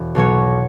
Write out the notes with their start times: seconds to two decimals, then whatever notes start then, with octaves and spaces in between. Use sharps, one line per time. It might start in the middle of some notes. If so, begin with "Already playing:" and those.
Already playing: E1 E5
0.15 B1 B2 F#3 C#5